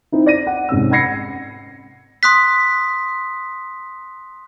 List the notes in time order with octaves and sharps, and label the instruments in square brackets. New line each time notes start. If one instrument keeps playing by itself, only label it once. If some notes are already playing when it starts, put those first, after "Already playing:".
[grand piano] C4 D#4 E4
D5 A#6 D#7
F#5
G#2 C3 C#4 E6
F#5 B5 G#6 A#6 C7 C#7
[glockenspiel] C6 D#6 F#6 B6